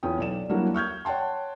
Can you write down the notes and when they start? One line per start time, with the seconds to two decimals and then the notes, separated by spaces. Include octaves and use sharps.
0.03 E2 C#4 F4 G5 D#6
0.18 B1 D5 E7
0.49 F#3 G3 A#3 D4 E4 F#4
0.74 C#6 F6 G6 G#6
1.05 C#5 F#5 G5 A5 C6